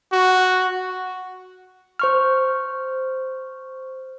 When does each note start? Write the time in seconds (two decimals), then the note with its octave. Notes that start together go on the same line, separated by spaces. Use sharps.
0.13 F#4
1.99 C5 C#6 F6